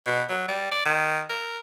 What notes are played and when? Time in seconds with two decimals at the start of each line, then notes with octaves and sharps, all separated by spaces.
0.07 B2
0.29 F#3
0.48 G3
0.71 D5
0.85 D#3
1.29 A#4